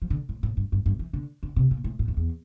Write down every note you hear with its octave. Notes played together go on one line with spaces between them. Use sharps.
F3
D3
A2
A2
G2
G2
G2
E3
D3
D3
C3
A#2
A2
A2
F2
E2